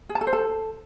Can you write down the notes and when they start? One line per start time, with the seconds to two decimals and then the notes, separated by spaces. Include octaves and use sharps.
0.09 G#4
0.15 A5
0.21 A4
0.27 C5
0.33 A4